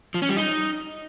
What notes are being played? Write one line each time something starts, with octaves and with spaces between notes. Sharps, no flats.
F3
C#4
G3
D#4